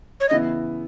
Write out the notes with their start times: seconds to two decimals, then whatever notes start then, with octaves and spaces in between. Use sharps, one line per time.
0.20 C#5
0.29 C#3 E3 B3 E4 D#5